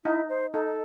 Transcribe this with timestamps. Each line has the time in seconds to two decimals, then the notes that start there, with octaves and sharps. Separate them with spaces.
0.05 D#4 E4
0.29 C5
0.53 D#4 A4